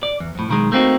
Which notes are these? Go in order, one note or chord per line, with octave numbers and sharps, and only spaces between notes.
D5
E2
F2 A2
B1 D#3 G#3
A3 A#3 C4 D#4 F#4